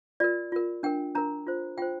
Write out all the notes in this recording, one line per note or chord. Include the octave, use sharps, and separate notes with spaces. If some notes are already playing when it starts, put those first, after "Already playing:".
F4 A#4 D5
F4 A#4
D4 A#4 G5
D4 A#4 A#5
F4 C5
F4 C5 G5